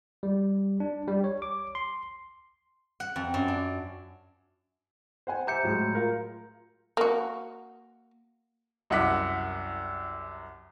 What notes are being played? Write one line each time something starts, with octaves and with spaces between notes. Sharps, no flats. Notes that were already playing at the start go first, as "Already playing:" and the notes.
G3
D4
G3
C#5
D6
C6
F#5
F2
F#2
D4
C5 F#5 G#5
G4 C5 E5 A#5 G6 C#7
A2 F#3 G#3
F4 A#4 F5
A#3 F#4
C2 F#2 E4 F#5 D6 B6